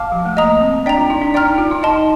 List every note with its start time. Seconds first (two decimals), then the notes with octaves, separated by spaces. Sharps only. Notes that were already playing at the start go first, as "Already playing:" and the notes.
Already playing: F5 A5 D6 F6
0.12 F3
0.25 A3
0.37 A#3 D#5 A#5 D#6
0.61 C4
0.86 D4 D5 G5 A#5
0.97 F4
1.10 D#4
1.22 D4
1.34 D#4 D5 G5 A#5 F6
1.46 D#4
1.58 F4
1.71 D#4
1.83 D#4 D#5 A5 C6